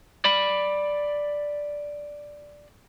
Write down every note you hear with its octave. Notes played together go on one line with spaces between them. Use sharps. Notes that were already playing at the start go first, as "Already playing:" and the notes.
D5 B5